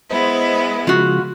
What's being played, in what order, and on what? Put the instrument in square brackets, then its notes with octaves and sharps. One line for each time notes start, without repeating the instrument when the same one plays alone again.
[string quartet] G#3 B3 E4 [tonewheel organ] C5 D#5
[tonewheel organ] C#3 F3 G#3 [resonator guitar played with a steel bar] F4 F#4